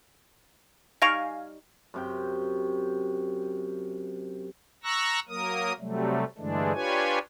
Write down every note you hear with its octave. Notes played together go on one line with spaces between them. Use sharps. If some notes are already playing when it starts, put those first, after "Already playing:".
G3 D#4 F5 G#5 C#6 A#6 D7 F7
F#2 C3 G5
A#5 C#6 E6 F#6 A#6
F#3 A#3 A#4 D#6
C3 F#3 G3 A3
G2 D3 E3 G#3 A3 D4
D4 F4 G4 B4 C#5 G#5